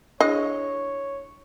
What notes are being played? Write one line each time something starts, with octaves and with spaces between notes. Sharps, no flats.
D4 E4 G#4 C#5 D#5